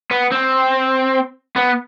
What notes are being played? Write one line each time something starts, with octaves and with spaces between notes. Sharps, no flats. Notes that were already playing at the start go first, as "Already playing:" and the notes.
B3
C4
B3